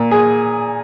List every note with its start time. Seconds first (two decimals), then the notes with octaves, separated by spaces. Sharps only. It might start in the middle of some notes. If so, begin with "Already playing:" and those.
Already playing: A#2
0.11 G#4